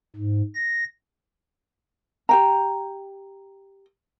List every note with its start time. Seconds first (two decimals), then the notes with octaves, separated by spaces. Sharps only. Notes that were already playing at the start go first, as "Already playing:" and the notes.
0.16 G#2
0.55 A#6
2.29 G4 G5 A#5